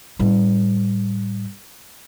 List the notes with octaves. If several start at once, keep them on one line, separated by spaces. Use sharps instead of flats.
A2 G3